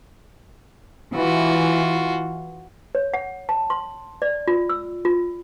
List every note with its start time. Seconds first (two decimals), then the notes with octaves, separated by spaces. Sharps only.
1.15 E3 F4 F#4
2.95 C#5
3.14 F#5
3.49 A5
3.70 C6
4.22 D5
4.48 F4
4.69 E6
5.05 F4